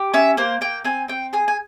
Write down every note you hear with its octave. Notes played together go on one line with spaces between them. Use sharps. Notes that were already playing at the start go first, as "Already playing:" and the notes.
Already playing: G4
C#4 E5
A#3 C5
A#3 G5
C4 G#5
C4 G5
G#4 G#5
G#5